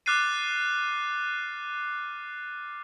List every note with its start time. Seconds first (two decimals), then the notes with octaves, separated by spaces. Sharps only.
0.06 D6 F6 F#6 A6 C7 D#7